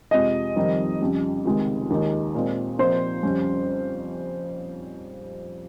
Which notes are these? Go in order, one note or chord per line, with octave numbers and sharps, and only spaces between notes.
F2 C3 F3 G#3 D#5
F2 D#3 G3 C4 D#4
F2 C#3 G3
C#2 C3 D#3 G#3
D#2 D#3 G#3 D#4
A#2 G#3 C4
A#2 F3 C4 D#4 C5
F2 C#3 G3 C#4